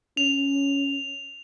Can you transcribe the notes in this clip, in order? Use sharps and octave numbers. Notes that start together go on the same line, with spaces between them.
C#4 F7